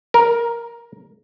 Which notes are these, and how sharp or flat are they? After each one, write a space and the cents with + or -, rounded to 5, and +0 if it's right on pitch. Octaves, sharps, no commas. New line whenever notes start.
A#4 +5